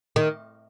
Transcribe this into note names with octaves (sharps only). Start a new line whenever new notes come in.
D#3